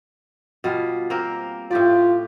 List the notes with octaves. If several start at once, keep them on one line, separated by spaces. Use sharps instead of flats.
B2 G3 F4
A#3 C4 A#4
A2 F4 G4 D5